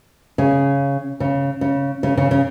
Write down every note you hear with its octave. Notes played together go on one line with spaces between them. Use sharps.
C#3
C#3
C#3
C#3
C#3
C#3